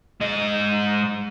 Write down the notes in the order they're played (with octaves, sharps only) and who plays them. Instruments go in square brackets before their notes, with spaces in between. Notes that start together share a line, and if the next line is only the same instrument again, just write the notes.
[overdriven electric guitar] G#2 D#5